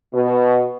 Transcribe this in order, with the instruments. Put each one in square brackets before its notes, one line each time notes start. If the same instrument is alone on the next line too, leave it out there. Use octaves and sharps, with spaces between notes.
[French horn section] B2